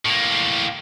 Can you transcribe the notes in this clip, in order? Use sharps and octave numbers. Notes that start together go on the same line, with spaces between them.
A2 A#3